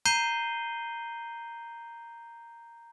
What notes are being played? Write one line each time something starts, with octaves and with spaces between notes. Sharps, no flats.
A#5 G6 C7 D#7 G7